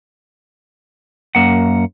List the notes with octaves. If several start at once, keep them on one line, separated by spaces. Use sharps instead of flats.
F#2 A#3 F#5